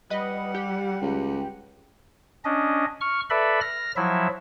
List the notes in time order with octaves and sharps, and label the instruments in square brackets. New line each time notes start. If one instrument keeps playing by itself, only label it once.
[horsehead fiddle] G3 F#5 [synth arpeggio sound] B4 D#5
[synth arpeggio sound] G4
[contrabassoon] C#2
[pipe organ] C#4 D4 D#5
C#6 F6
A4 B4 D5 E5 B5
F6 A#6
F3 F#3 E4 E5